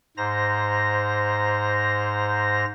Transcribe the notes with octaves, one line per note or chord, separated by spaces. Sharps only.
G#2 C5 A#5 A#6